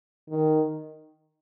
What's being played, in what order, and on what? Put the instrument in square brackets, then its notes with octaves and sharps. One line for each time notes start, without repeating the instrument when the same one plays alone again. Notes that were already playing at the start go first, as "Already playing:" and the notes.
[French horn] D#3